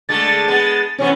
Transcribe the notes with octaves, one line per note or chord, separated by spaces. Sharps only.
D3 G#3 A3 A6
G#3 B3
C3 E3 B3 C#4